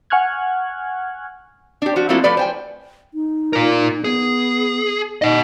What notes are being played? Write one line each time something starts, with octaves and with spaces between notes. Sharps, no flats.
F#5 G#5 C#6 F6 F#6 G#6
D4 G4
F3 F#4
F3 A3 A#3 C4 E4 F#4
F3 A3 B4 D5
C5 G5 G#5
D#4
F4 A#4
B3 G#4
D#4 D#5 F#5